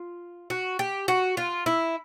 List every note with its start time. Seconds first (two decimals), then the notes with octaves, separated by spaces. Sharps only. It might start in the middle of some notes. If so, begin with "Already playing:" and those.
Already playing: F4
0.50 F#4
0.79 G4
1.08 F#4
1.37 F4
1.66 E4